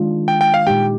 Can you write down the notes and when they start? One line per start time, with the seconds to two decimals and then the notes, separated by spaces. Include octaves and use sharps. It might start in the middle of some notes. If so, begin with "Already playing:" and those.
Already playing: D#3 G#3 D4 F4
0.28 G5
0.41 G5
0.54 F5
0.67 A#2 G#3 D#4 G4 G5